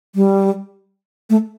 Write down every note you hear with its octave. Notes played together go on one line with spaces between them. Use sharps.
G3
A3